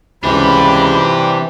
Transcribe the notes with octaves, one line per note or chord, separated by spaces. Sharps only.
C#2 C3 E3 D4 G4 B5